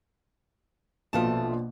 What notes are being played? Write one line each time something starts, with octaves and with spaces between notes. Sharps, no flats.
A#1 B2 F3 A3 F4 A5